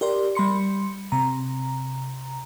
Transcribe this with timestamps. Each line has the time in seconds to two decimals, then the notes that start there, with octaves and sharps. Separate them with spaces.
0.01 G4 A#4 D5 C6
0.35 G3 B5 C6 C#7
1.12 C3 A#5